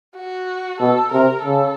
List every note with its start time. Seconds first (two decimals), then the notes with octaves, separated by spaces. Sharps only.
0.17 F#4
0.80 B2 A4
1.12 C3 A#4
1.44 C#3 A4